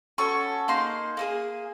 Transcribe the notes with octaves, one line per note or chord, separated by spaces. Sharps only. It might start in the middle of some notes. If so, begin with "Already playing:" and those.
C#4 F#4 A4 C#6
A#3 D#4 G#4 C6
A#3 D#4 G#4